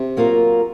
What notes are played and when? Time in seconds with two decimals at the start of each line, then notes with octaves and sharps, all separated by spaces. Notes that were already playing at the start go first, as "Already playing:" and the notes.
Already playing: C3
0.17 F#3 A#3 F4 A#4